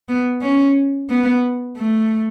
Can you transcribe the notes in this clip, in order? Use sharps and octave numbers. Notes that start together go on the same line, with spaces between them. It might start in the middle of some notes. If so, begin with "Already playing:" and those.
B3
C#4
B3
A3